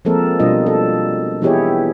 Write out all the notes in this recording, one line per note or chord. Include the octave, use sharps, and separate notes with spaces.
F3 G#3 A#3 C4 A4 A#4
B2 G3 D4 F4 D#5
A4
E3 B3 E4 G4 G#4 C#5